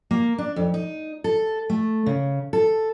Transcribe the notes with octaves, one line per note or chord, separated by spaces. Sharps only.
A#3
D4
F2
D#4
A4
A3
C#3
A4